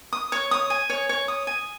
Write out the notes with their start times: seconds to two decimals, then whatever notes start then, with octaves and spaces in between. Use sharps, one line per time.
0.13 D#6
0.32 C#5
0.51 D#6
0.70 G#5
0.90 C#5
1.09 C#5
1.28 D#6
1.47 G#5